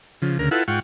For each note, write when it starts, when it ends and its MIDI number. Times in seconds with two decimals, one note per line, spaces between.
0.22 0.38 49
0.22 0.38 53
0.39 0.49 38
0.39 0.49 49
0.39 0.49 70
0.51 0.63 64
0.51 0.63 65
0.51 0.63 69
0.51 0.63 71
0.51 0.63 78
0.68 0.80 44
0.68 0.80 65
0.68 0.80 78
0.68 0.80 79
0.68 0.80 85